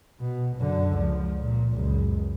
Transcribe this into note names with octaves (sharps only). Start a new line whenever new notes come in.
B2
F#2 D3
C#2 F3
A#2
C#2 F#2